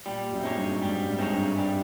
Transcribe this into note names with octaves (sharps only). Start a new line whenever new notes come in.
A#2 G3
F#2
C4 D#4 G#4 C#5
G2
G#2 G3
G#2
C4 D#4 G#4 C#5
G2
G3